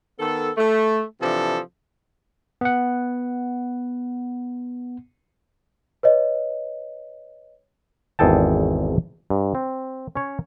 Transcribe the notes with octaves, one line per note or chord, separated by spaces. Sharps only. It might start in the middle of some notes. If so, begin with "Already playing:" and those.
D#3 B3 A4
A3
C3 E3 F3 D4 A4
B3 F#5
B4 C#5 D#5
G#1 E2 G#4 A4 G5 A5
G2
C4
C#4 C#5